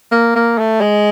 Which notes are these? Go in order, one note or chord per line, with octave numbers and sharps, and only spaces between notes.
A#3
A#3
A3
G#3